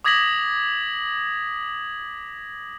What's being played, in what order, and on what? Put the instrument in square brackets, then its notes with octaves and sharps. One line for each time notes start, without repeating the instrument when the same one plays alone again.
[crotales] D6 D#6 G#6 A#6 B6 F#7